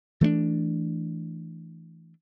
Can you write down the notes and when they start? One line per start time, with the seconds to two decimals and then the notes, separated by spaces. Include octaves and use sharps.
0.21 E3 A3 B3 D4